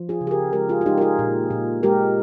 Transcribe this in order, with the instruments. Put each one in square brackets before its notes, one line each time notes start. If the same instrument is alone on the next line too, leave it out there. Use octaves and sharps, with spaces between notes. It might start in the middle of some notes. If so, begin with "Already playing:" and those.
Already playing: [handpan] F3
F4 G#4
C#3
G#4
G4 A#4
G#3 G4 A#4
F4 G#4
F4
G#3 D#4 G4
A#4
F4 G#4
A#2
A#2
G#3 G4 A#4